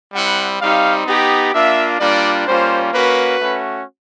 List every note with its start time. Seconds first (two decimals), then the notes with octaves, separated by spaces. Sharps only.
0.14 G3 C4 E4 F#5
0.60 G3 C4 D#4 G4 F5
1.07 B3 D#4 G4
1.53 A#3 D4 F4 E5
2.00 G3 A#3 D4 F4 D5
2.46 G3 A#3 C#4 F4 C5
2.93 A#3 C#4 F#4 B4
3.40 A3 C#4 F#4